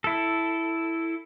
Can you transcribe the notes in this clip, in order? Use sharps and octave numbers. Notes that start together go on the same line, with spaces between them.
E4 A4